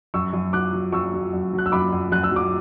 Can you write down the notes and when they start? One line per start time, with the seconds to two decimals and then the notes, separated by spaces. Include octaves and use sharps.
0.14 F#2 C#6 E6
0.33 F#2
0.53 F#3 D6 F#6
0.73 F#3
0.92 F#2 C#6 E6
1.14 F#3
1.33 F#2
1.53 F#3
1.58 F#6
1.66 E6
1.72 F#2 B5 D6
1.93 F#2
2.12 F#2 F#6
2.24 E6
2.32 F#3 D6